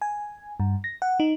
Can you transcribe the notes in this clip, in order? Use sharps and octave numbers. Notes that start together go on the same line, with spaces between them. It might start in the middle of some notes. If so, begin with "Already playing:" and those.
G#5
G2
A#6
F#5
D#4